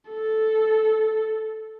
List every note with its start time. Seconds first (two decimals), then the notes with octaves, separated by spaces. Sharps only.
0.09 A4